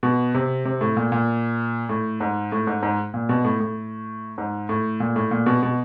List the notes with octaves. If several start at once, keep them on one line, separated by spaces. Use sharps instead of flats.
B2
C3
C3
A2
A#2
A#2
A2
G#2
A2
G#2
G#2
A#2
B2
A2
A2
G#2
A2
A#2
A2
A#2
B2
B2